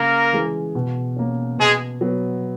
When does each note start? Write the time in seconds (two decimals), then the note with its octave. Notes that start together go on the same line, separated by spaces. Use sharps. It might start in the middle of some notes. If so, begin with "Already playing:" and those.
Already playing: C#3 A#3 A#4
0.33 E3 G#3
0.75 B2
1.16 A#3 C#4
1.58 B2 G#3 G#4
2.01 F#3 B3